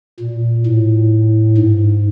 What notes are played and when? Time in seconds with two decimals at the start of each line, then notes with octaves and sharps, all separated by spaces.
0.20 A#2
0.66 A2
1.58 G#2